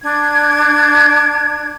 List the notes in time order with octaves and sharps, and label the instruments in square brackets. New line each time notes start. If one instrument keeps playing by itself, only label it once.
[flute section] D4 G#6